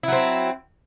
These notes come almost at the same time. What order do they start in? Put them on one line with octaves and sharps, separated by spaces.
E4 F#3 C4